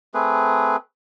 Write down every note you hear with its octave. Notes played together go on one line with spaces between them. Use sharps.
A3 C4 G#4 B4